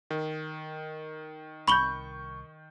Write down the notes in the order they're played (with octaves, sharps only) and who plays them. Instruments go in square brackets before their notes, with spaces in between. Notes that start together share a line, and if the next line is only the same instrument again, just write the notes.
[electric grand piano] D#3
[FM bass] C2 [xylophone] B5 F#7 G7 [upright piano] C#6 G6